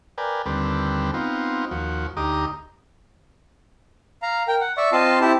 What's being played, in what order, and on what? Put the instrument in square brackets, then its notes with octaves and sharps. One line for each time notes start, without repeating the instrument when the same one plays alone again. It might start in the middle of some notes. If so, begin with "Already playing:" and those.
[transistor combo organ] A#4 B4 D5 G5 G#5
D#2 D3 G3 C4 A4 B4
B3 C4 D#4 F4
D#2 F3 F#4
D2 D#4 G4 A#5 D6 D#6
[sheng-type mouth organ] F5 A#5
A#4 G5
F#5
D5 E5 C#6
C4 F4 D#5 F5 A5
C4 E4 G4 A5